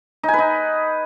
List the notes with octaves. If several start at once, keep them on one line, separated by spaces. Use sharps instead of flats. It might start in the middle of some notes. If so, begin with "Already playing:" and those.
D#4
G#5
B4
D#4